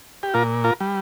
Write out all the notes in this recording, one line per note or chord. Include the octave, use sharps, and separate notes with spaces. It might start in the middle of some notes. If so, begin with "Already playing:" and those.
G4
A#2 F4 A#4
F4 A#4
G3